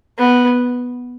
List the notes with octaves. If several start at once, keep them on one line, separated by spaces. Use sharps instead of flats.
B3